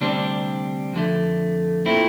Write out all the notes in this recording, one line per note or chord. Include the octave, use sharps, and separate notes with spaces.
D2 C3 G3 C4 D4
F2 D3 A3
A#2 A3 C4 E4